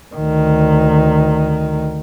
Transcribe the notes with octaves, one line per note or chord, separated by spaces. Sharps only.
D2 D#3